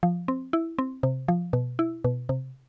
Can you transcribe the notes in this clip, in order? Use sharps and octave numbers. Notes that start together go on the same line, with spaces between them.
F3
C4
E4
C4
C3
F3
B2
E4
B2
C3